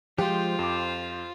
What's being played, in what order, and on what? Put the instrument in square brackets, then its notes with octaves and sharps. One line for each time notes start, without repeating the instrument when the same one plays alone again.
[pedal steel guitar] F3 G#3 C5 [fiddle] F4 [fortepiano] G4
[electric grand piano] F2 D6 [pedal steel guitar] C5